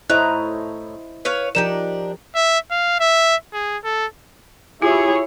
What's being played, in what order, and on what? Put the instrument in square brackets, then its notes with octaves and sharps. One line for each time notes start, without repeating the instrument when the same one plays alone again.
[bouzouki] A2 A#5 [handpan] E4 C5 D#5 [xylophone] F#6
[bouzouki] B4 C#5 F5
[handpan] F3 A#4 [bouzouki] D4 D#4 G4 [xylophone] E7
[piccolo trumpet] E5
F5
E5
G#4
A4
[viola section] E4 G4 C#5 [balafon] F4 [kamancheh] G#4